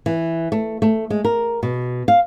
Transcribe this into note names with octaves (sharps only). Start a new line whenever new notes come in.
E3
A3
A3
G#3
A#4
B2
F5